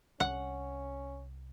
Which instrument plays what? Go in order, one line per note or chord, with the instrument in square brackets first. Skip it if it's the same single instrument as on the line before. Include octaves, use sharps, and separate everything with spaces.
[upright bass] C2 [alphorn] C#4 [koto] F#5